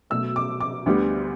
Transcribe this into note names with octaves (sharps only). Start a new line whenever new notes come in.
B2 F#3 A3 E6
D6
D6
D2 D3 G3 B3